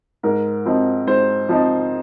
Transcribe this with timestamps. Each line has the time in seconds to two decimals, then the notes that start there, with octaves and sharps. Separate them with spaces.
0.23 G#2 A#4
0.65 F3 C4 D#4
1.07 G#2 C5
1.49 F3 C4 D#4